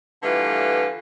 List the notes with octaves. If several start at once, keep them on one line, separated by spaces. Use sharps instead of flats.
D3 E3 G3 A3 F4 B4